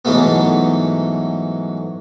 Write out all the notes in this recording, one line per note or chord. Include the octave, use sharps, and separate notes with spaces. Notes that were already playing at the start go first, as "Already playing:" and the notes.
G#2 E3 F#3 G#3 A3 B3